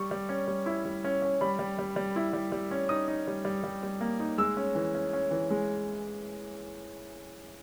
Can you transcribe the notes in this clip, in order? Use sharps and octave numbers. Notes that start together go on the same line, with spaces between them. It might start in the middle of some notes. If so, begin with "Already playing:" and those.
Already playing: G3 C#6
G3
C#4
G3
E4
G3
C#4
C#4
G3 B5
G3
G3
G3
E4
G3
G3
C#4
D#4 D#6
D#4
G3
G3
G3
G3
A#3
D#4
G#3 E6
C#4
E3
C#4
C#4
E3
G#3